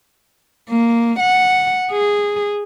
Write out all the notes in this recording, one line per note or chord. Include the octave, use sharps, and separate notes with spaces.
A#3
F#5
G#4